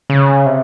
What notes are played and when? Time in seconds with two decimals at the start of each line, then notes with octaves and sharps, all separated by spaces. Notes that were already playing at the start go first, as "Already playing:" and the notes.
0.10 C#3
0.46 C3